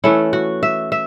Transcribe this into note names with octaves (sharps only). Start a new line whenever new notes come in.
E3 A3 C#4 E4
F#4
E5
E5